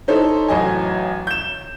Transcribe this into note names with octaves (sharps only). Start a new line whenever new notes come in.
D#4 E4 A4 C5 C#5
A1 F#3 D#5 G#5
G6 E7